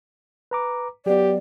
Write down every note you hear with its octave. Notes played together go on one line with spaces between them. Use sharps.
B4 A#5 D6
F#3 B3 G4 D5